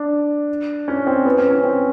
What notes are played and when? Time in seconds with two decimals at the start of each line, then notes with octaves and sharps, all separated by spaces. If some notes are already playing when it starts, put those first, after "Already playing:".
Already playing: D4
0.88 C#4
1.07 C4
1.25 B3
1.38 C#4
1.51 C#4
1.64 C4